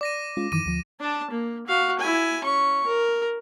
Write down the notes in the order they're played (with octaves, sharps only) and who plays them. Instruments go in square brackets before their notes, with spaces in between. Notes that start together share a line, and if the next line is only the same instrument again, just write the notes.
[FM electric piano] D5 [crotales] D6 A#6 D#7
[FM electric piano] G#3 C#4 F4
[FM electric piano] F#2 D#3 E3 [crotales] D6 D#7
[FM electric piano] D2 F3
[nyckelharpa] D4 A5
A#3
F#4 F5
E4 G#5
C#4 C#6
A#4